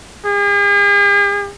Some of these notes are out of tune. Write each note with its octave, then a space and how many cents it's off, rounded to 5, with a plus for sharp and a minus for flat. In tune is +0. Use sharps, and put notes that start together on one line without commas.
G#4 -45